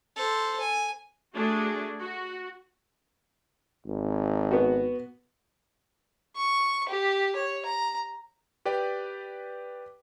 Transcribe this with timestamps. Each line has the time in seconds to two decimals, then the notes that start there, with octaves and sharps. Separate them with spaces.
0.16 A4 C5
0.60 G#5
1.33 A3 D4 F#4 G#4
1.99 F#4
3.86 G#1
4.51 B3 F#4
6.36 C#6
6.89 G4
7.36 C#5
7.65 A#5
8.65 G4 B4 D5 G5